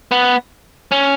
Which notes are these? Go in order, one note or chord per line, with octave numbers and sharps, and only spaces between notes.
B3
C#4